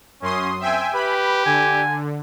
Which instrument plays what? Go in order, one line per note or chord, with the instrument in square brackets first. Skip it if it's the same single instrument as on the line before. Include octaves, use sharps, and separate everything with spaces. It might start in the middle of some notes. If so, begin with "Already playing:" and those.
[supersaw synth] F#2 C6 D#6 [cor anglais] C#4
[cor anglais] C4 [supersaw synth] E5 G5 G#5
[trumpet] G4 [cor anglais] B4 [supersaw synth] B5
[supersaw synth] D3 [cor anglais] G#5